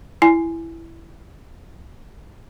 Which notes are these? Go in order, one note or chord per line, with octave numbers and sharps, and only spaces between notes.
E4 G#5